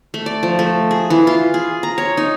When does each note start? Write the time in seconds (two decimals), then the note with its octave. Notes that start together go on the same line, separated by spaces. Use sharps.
0.14 A3
0.26 D5
0.43 F3
0.59 A3
0.91 G#4
1.10 E3
1.27 F4
1.54 G#4
1.83 A#5
1.98 C#5
2.17 D#4